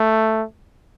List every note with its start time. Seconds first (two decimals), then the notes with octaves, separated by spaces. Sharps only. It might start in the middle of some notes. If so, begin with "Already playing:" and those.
Already playing: A3